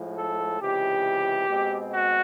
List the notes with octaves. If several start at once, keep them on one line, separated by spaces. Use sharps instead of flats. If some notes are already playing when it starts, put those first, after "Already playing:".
Already playing: A2 F3 G#3
A4
C#2 C3 E3 G4
B2 G#3 C4
F#4